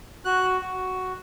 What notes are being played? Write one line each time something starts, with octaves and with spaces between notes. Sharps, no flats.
F#4 F#6
F#4